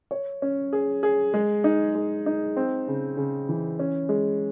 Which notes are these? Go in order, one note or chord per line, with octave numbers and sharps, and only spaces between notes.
C#5
C#4
G#4
G#4
G#3
D#4
G#3
D#4
C4
C#3
C#3
E3
C#4
G#3